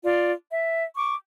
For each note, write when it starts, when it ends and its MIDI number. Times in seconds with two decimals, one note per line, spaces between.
0.03 0.32 65
0.03 0.32 74
0.51 0.83 76
0.96 1.14 85
0.96 1.14 86